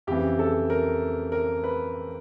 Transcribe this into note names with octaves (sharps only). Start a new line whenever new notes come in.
F2 C#3 E3 G4
A4
A#4
A#4
B4